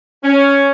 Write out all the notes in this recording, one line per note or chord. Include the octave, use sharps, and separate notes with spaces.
C#4